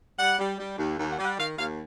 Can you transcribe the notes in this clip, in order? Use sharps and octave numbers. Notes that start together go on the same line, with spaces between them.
G3 F#5
G3
G3
D#2
D#2
F#5
G3
F#5
D#3 F5
D#2 F5